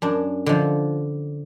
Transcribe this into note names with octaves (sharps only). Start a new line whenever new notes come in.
F#2 D4
D3 F3